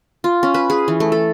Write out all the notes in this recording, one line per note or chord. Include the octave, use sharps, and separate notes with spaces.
F4
C#4
B4
G#4
E3
A3
A4